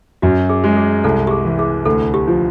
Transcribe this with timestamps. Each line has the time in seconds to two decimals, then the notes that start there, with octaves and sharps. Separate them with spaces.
0.22 F#2 F#4
0.50 G#4
0.64 G#3
0.77 G#4
1.04 C2 A4
1.27 G4
1.31 G#4
1.45 E3
1.59 G#4
1.85 D2 A4
2.14 G4
2.27 F3